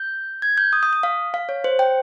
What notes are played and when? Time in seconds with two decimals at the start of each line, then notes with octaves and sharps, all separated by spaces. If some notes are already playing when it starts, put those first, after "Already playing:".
Already playing: G6
0.42 G#6
0.57 G6
0.73 D#6
0.83 D#6
0.93 D#6
1.03 F5
1.34 F5
1.49 C#5
1.64 C5
1.79 G5